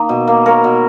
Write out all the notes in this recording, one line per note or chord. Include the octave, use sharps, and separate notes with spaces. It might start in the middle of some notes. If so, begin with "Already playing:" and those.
Already playing: D#3 A#3 D#5
B2
A#3
A#3 A#4 C#5
B2